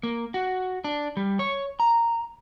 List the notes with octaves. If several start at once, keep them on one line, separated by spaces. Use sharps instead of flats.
A#3
F#4
D4
G3
C#5
A#5